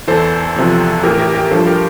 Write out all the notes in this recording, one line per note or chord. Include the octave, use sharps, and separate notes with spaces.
E2 E3 A4 C5
E2 C3 F3
A2 E3 G4 A#4
G4 A#4
G4 A#4
G2 F3 A4 C5
G4 A#4